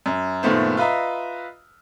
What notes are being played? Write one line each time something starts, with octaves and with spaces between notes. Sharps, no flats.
F#2
F#1 A#2 D#3 A3 B3 C5
F4 B4 D#5 E5 A#5